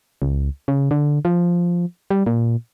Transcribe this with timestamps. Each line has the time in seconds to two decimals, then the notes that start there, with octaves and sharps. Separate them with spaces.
0.22 C#2
0.68 C#3
0.91 D3
1.25 F3
2.10 G3
2.26 A#2